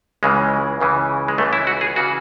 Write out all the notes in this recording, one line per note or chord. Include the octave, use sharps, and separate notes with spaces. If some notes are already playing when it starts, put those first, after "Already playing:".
C#2 C#3 E3 G#3
C#2 C#3 E3
G#3
C#2 C#3 E3 A3
E4
F#4
G#4
C#3 E3 F#4